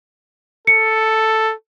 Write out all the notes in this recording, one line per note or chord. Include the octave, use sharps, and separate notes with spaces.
A4 C#7